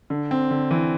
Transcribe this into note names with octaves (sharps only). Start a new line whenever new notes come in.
D3
C4
D3
E3